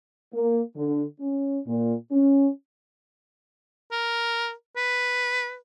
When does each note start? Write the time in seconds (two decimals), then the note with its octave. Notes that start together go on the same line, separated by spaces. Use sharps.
0.33 A#3
0.76 D3
1.20 C#4
1.67 A#2
2.12 C#4
3.92 A#4
4.76 B4